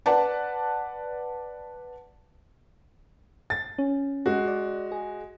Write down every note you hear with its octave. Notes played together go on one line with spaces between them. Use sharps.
B4 D5 F#5 A5
A6
C#4
G#3 F#4
D5
G#4